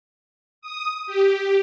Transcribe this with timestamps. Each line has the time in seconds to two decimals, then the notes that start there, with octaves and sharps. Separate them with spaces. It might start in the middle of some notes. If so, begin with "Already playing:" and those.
0.62 D#6
1.07 G4